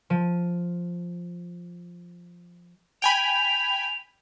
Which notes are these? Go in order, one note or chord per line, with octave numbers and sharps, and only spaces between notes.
F3 D#7
G5 G#5 B5 F7